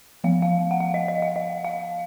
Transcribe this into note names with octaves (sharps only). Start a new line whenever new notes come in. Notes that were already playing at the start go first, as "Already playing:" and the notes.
F3 B3 F5
F5
F#5
F5
D#5
D#5
F5
D#5
F5